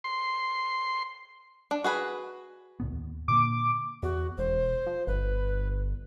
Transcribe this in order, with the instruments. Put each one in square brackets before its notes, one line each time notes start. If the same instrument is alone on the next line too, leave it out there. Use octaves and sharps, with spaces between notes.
[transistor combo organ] C6
[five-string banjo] D4
F#4 G#4 B4
[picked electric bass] C#2 A2 B3
D#2
[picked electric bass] A#2 D3 A#3 [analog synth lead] D6
[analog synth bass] E2 [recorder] F#4
[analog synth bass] E1 [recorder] C5
[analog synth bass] F3
[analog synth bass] G1 [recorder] B4